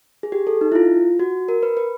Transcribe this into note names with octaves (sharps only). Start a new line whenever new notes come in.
G#4
G4
A4
D#4
E4
F4
F#4
A#4
B4
B4